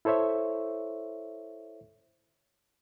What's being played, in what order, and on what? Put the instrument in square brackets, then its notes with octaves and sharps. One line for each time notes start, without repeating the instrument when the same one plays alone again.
[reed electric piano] E4 A4 C5 C#5 E5